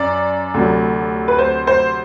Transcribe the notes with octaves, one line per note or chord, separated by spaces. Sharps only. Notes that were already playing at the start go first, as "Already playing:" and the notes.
Already playing: F#2 D5
D2 C3 F#3
B4
C5
C5